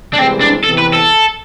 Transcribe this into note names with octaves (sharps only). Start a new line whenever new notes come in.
D4
C2 C3 E3 G#3 C4
D4
E2 C3 E3 A4
B4
A4